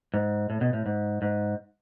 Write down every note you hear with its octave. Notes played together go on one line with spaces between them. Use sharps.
G#2
A2
B2
A2
G#2
G#2